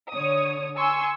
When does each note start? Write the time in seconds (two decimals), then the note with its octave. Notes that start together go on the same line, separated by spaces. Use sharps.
0.13 D3 C#5 D#6
0.77 G#5 C6 C#6 E6 G#6